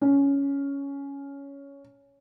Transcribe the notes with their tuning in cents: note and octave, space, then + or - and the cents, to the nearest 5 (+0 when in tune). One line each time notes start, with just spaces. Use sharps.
C#4 +10